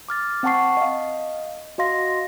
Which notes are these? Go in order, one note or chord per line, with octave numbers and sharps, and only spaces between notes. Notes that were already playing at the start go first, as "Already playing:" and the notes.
D6 F6 A6
C4 F#5 G5 A5 C#6 C7
D#5 F5
F#4 D#5 F5 C6 A#6